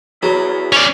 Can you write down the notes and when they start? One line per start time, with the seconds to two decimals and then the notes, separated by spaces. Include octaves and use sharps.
0.23 F#3 E4 G#4 B4
0.72 C#4 D5